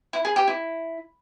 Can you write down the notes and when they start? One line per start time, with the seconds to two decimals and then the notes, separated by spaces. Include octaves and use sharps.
0.13 E4
0.25 G#4
0.36 G4
0.47 E4